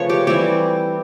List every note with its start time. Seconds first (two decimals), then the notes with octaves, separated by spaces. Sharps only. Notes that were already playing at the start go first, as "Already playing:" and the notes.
Already playing: C#3 F3 A3 B4 C#5
0.10 G4
0.27 E3 G3 C4 E4 G4